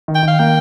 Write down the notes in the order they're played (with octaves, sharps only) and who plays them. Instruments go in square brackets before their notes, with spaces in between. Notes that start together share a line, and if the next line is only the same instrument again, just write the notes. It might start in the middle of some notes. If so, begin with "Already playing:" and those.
[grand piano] D#3
[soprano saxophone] G5
[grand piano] D#3
[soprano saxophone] F5
[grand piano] A#3 [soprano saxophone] G5